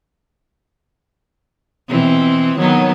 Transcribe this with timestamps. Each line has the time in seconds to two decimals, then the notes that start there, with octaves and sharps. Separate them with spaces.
1.88 B2 E3 C4
2.57 D#3 F#3 B3